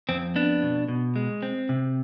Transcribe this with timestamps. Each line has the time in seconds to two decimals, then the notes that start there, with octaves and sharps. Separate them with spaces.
0.09 F2 C4
0.36 B3 D4
0.62 B2
0.88 B2
1.16 G#3
1.43 C4
1.69 C3